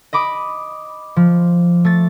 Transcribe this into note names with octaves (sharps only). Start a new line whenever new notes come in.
D#5 B5 D6 D#6
F3
A3 A6